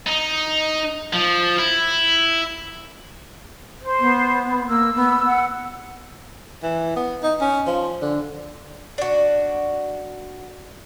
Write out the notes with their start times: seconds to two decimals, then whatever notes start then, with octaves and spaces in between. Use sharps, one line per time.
0.06 D#4
1.13 F3
1.59 E4
3.82 C5
4.00 B3
4.68 A#3 E6
4.95 B3
5.26 F#5
6.63 E3
6.96 B3
7.23 D#4
7.41 C#4
7.66 F3
8.02 D3
8.98 D4 F#4